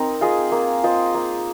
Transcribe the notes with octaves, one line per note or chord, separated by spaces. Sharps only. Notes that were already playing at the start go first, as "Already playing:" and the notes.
Already playing: C4 D#4 A#4
F4 G#4 D#5
A#3
F4 C5 D#5
A#3